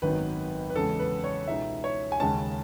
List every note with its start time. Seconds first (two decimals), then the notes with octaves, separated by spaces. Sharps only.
0.02 G#1 F#2 D#3 F#3 B3 B4
0.70 B4
0.75 E2 C#3 G#3 A4
0.99 B4
1.24 C#5
1.48 C#2 B2 G#3 D#4 E5
1.84 C#5
2.12 G#5
2.20 D#2 C#3 G#3 C#4 A5